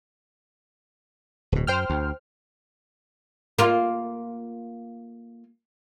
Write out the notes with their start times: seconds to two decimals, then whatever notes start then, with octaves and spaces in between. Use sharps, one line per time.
1.52 D1 B2
1.67 F#2 C5 G5 F6
1.90 D2
3.59 A#3 F4